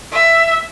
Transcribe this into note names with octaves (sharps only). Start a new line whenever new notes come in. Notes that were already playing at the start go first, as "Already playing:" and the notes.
E5